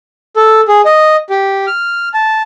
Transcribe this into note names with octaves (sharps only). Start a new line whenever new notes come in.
A4
G#4
D#5
G4
F6
A5